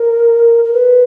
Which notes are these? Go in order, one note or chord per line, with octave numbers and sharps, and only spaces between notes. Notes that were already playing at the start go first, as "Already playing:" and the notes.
Already playing: A#4
A#4
B4